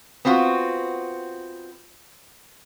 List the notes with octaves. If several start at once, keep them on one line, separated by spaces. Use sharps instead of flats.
B3 C4 F4 F#4